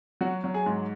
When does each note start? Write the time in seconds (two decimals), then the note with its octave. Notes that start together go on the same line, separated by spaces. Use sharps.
0.21 F#3 F#4
0.44 F#3
0.54 G#4
0.66 G#2